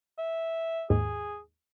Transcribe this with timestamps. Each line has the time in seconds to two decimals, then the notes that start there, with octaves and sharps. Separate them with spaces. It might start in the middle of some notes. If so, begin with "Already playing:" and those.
0.19 E5
0.90 D#2 G#2 G#4